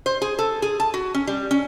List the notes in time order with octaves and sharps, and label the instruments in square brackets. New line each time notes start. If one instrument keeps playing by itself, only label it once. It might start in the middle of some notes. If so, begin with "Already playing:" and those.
[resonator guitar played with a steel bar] C5
G#4
A4
G#4
A5
F#4
C#4
G3
C#4